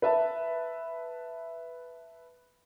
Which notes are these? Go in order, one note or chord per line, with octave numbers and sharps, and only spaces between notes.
B4 E5 A5